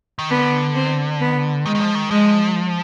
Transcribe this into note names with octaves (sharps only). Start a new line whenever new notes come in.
D#3
D3 B3
C4
B3
D#3 G#3
D#3
F3
D#3
F3 G#3